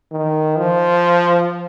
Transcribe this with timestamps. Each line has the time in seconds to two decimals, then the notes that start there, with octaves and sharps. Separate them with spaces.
0.12 D#3
0.58 F3